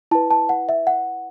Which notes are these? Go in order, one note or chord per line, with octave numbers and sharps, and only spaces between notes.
E4 B4 A5
A5
F#5
E5
F#5